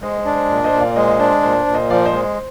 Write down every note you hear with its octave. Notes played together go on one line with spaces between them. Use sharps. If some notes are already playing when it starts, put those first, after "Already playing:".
G#3 C5 D#5
C5
D4
C5
A#2
C5 D#5
A#2
D5 F5
G#3 C5 D#5
C5 D#5
D4 C5
A#2 C5
C5
A#2
C5 D#5
F3 D5 F5
C5 D#5
G#3
C5